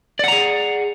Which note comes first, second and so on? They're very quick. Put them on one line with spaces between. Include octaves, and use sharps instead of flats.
D5 F#5 A#5 G#4